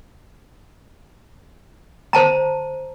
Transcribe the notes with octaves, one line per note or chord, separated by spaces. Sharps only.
C5 A5 A#5